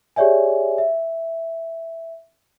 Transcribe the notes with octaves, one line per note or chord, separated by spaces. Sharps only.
G4 G#4 C#5 D5 E5 G#5
E5